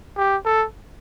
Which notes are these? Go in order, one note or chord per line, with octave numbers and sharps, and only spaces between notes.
G4
A4